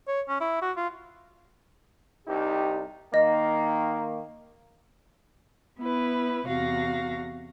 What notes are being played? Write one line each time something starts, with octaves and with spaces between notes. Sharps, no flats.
C#5
C#4
E4
F#4
F4
C2 D#4 G4
D#3 A#3 D#5
B3 E4 B4
E2 C3 F#4 F5 A#6